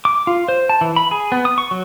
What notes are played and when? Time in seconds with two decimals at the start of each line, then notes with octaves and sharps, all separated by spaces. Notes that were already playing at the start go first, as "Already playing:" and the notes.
0.05 D6
0.27 F4
0.48 C5
0.69 A5
0.81 E3
0.96 B5
1.11 G#4
1.32 B3
1.45 D#6
1.58 C#6
1.71 F#3